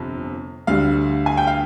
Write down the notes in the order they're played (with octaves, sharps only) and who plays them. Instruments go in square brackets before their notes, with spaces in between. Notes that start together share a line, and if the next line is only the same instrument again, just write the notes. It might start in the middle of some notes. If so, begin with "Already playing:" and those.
Already playing: [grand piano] G1 F2 C3
D2 D3 G3 F5
G#5
G5
F5